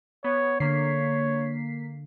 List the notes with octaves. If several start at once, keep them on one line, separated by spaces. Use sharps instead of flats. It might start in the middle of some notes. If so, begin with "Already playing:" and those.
B3 C#5
D3 A#3 C#5 B6 C7